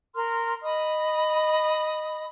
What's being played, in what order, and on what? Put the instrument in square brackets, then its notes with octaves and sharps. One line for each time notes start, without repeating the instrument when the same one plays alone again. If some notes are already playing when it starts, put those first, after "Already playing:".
[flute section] A#4 C6 F6
D#5 B5 D#6